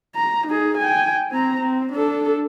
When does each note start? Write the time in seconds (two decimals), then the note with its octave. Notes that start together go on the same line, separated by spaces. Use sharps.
0.15 A#5
0.47 D#4 G#4
0.78 G5 G#5
1.31 C4 A#5
1.61 C4
1.92 D4 A4